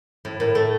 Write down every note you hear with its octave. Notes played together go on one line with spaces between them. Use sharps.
A2
A2 A#4
A3 A4